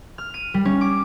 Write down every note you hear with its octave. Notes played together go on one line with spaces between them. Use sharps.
F6
D#7
G3
C#4
D6